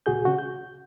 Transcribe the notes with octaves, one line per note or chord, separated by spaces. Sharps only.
C#2 A#2 F#4 G#4 G6
C#3 F#4
G6